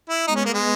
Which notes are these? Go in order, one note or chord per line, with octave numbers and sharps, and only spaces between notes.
E4
G#3 B3 D#4
C#4
A#3
G#3